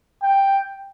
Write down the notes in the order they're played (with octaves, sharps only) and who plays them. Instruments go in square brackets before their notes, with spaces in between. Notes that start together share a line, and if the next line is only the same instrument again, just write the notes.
[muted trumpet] G5